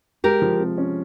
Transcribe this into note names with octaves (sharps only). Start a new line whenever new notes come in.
G#3 G4 A#4
F3
C3
C#4